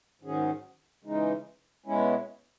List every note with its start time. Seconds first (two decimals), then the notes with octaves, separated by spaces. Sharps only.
0.22 G#2 D#3 F#3 C#4 G#4
1.04 C#3 E3 G#3 D#4
1.86 B2 G#3 C#4 E4